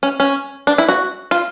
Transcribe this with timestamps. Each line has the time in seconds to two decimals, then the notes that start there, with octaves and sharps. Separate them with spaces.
0.03 C#4
0.20 C#4
0.67 D4
0.78 E4
0.89 F#4
1.31 F4